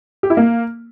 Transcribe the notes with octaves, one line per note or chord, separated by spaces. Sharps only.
G4
E4
A#3